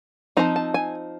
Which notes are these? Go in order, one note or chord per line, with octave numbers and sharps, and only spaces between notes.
F3 A3 C4 D#4 A#5
A5
G#5